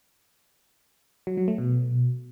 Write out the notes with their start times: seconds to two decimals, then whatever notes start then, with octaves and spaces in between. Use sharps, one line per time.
1.27 F#3
1.37 F#3
1.48 A3
1.58 B2